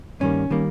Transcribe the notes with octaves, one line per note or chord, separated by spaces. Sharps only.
G2 D#3 G3 A#3 C#4
D#3 G3 A#3